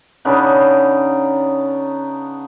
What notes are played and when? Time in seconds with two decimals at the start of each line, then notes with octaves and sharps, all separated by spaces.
0.25 C#3 B3 D4 D#4